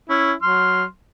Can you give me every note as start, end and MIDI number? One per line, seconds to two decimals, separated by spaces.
0.09 0.33 61
0.09 0.33 64
0.42 0.84 54
0.42 0.84 84
0.42 0.84 89